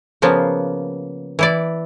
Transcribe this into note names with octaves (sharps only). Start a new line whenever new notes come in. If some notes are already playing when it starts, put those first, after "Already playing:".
C#3 F3 A#3 B3
E3 E4 D5